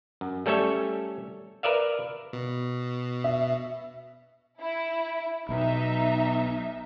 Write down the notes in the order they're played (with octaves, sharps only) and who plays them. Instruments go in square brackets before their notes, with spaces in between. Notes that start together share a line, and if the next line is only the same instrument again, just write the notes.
[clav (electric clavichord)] F#2
G3 A3 C#4 A4 C#5 E5
A#4 B4 D5 E5 F5
[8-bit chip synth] B2
[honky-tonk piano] E5
[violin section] E4
[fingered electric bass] B1 B2 [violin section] D#4 E5